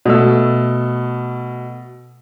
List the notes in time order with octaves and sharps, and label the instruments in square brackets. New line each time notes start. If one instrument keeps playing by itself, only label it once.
[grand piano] B2 A3 E6